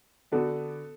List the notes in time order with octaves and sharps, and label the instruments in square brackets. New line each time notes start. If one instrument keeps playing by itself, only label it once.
[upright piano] D3 B3 D4 F#4 [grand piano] A4